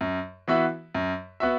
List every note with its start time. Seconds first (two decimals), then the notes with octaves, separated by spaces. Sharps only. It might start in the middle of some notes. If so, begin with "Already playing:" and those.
0.01 F#2
0.48 E3 B3 F#4 E5
0.95 F#2
1.40 B3 F#4 E5